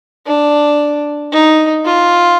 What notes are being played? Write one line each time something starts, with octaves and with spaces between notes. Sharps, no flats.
D4
D#4
F4